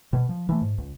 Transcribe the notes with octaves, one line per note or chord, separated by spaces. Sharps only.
B2
F3
E3 G#3 A3
G#2
C#2